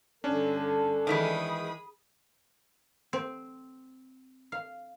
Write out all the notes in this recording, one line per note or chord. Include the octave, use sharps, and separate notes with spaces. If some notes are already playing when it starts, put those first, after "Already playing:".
G2 D3 C#4 D4 A4
D#3 E3 G#3 G#4 B5 D#6
C4
F5